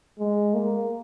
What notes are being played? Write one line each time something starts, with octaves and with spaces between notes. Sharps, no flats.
G#3
A#3